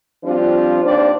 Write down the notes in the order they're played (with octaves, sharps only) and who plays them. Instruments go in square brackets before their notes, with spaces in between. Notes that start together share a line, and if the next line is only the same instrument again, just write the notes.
[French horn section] F3 G3 C4 D4 F4
D#2 D4 C5 D5